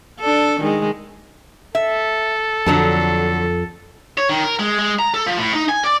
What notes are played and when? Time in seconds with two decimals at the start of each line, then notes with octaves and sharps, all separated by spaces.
0.19 D4 A4
0.60 D#3 G#3
1.75 A4 E5
2.66 F2 D3 F#3 A5
4.18 C#5
4.29 D#3
4.44 A#4
4.59 G#3
4.79 G#3
4.99 A#5
5.14 A4
5.27 F3
5.38 A2
5.53 D#4
5.69 G#5
5.84 D5